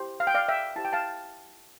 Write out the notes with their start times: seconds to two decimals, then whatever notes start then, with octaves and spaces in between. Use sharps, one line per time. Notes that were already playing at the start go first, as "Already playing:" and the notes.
Already playing: E4 G4 C5
0.20 F5
0.27 G5
0.34 D5 F5
0.48 E5 G5
0.76 E4 G4 C5 A5
0.85 G5
0.93 F5 A5